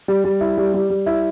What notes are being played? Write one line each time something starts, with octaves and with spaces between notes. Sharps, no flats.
G3
G3
E4
G3
G3
G3
E4